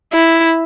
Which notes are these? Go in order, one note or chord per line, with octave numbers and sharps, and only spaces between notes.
E4